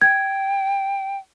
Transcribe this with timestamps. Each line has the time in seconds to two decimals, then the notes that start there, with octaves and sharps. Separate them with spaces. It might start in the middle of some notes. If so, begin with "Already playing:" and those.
0.02 G5 G#6